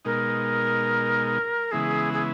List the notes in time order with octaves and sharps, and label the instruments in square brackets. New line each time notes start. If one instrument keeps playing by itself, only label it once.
[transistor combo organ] B2 G#3 D#4 [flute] A#4
[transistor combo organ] C#3 E3 G#3 B3 E4 [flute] G#4
[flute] G#4